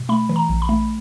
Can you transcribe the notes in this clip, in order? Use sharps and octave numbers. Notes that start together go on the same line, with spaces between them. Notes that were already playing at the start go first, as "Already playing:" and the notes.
Already playing: B2
A3 B5
E3
A#5
A#1
B5
A3